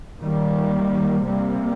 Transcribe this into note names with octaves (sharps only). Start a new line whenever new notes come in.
D#3 G3 A#3
C3 G3 A#3